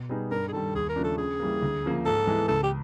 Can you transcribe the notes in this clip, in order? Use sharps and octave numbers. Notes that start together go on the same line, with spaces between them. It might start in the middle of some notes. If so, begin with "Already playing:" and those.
Already playing: B2
G3 B3 D#4 G#4
G2 A#4
G#4
D#3 G3 A4
D#2 G#4
A#4
C#3 F3 A3 D4
A4
C#3 G#4
E3 G3 A#3
D2
C#3 F3 A#3
G#2 A4
E3 G#3 B3
C#2 A4
G4